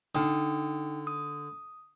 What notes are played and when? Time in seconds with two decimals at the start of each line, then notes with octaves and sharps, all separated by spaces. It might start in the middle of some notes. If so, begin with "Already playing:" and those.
0.15 D3 D#4 G5 D#6
1.07 D#6